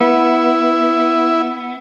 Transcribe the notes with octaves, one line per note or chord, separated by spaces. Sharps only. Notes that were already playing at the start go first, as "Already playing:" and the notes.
B3 E4